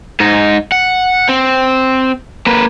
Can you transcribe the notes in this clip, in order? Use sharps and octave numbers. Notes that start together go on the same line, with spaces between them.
G#2 D#4
F#5
C4
A#3 B4